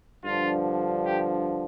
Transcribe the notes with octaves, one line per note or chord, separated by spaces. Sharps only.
G2 D3 F3 F4
G4